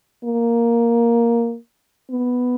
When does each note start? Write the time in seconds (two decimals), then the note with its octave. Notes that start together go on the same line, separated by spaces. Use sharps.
0.24 A#3
2.11 B3